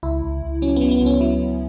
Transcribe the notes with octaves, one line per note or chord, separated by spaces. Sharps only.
C#2 E4
C#2
C#2
F#3 C#4
F#3 B3
B3
C#2
C#4
F#3 E4
C#2